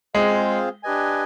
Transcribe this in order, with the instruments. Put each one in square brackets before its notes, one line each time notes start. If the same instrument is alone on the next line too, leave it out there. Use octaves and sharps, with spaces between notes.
[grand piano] G#3 [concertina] C4 F4 G#4 C5 F5
[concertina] D4 G4 B4 D#5 G#5